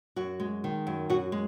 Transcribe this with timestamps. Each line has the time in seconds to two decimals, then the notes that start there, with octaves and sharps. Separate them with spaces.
0.16 F#2 F#4
0.40 G#3
0.64 D#3
0.87 F#2
1.10 F#2 F#4
1.32 G#3